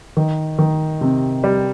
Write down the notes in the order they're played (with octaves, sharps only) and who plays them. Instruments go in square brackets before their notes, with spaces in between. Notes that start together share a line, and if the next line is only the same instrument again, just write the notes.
[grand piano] D#3
D#3
C3
G3